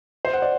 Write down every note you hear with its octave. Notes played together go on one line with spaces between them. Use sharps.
C5
F#5
D5